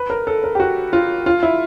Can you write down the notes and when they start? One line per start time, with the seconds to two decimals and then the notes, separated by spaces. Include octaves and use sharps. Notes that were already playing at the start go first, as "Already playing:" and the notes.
Already playing: B4
0.10 A#4
0.27 A4
0.44 A#4
0.55 G4
0.60 F#4
0.93 F4
1.26 F4
1.43 E4